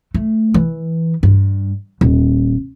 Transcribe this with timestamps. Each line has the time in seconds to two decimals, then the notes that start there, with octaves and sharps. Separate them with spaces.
0.14 A3
0.54 E3
1.23 G2
2.01 D#1